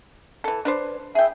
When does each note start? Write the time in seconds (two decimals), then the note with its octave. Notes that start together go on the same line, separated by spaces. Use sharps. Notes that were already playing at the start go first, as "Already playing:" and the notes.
0.44 E3 A4
0.65 D4 B4 C5
1.15 G#4 E5 G5